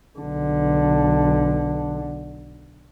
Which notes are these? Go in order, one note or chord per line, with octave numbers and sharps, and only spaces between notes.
B1 D3